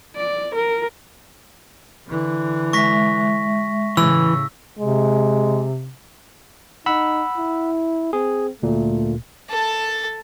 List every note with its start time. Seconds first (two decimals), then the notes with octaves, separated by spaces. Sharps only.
0.16 D5
0.55 A#4
2.07 D3 E3
2.73 G#3 E5 C#6 A#6 B6
3.97 A2 C#3 E3 E6
4.79 C3 G#3
6.86 D#4 F#5 B5 E6
7.37 E4
8.13 C4 G#4
8.63 D2 A#2 A3
9.49 A4 A5